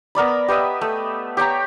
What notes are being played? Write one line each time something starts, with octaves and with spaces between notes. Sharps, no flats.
B3 A#4 D5 B5
G4 B4 D#5 E5
A3
G4 C#5 G5 A#5